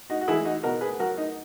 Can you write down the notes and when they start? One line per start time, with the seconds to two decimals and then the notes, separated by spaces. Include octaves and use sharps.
0.10 D#4 F#4
0.21 F#4
0.28 E3 E4 G#4
0.31 G#3
0.45 D#4 F#4
0.63 B2 F#4 A#4
0.81 G#4 B4
0.99 F#3 F#4 A#4
1.17 D#4